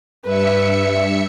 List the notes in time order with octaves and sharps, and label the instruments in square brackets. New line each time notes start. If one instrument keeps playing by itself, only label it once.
[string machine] G2 E5 C#7 [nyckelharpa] B4